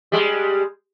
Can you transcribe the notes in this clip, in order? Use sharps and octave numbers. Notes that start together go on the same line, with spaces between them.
G3 G#3